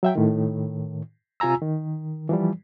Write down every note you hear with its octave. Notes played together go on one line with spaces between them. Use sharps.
F#3 E5 G5
A2 D#3
C3 F4 G#5 A#5 E6
D#3
E3 F3 G3